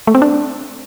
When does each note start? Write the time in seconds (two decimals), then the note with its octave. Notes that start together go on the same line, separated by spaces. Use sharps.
0.07 A3
0.15 C4
0.22 D4